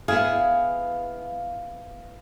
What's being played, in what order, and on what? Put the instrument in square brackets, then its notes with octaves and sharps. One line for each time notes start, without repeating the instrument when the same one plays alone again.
[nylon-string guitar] B3 E4 G#4 [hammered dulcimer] F5